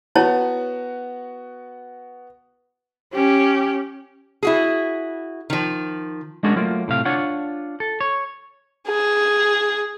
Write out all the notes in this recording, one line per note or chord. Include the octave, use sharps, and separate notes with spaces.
B3 E4 F#4 C#5 A5
C#4 G4
E4 F#4 G#4
D#3 F3
G#3 C#4 D4 F#4 G#4 A#4
F#3 A3 A#3 F4
A2 C3 F5
D4 F4 C#5 F#5
A4
C#5
G#4